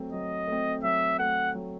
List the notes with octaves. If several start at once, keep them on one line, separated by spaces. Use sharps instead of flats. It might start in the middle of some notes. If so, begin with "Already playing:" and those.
Already playing: F#3 A3 C4
F#3 D#5
A3 C4
F#3 E5
A3 C4 F#5
F#3